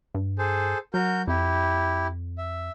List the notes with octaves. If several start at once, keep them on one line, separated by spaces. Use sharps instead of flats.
G2
G#4 A4 C5
F#3 F#4 A#4 G6
F2 E4 G4
E5